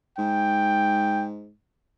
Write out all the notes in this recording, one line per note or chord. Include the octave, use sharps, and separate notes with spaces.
G#2 G5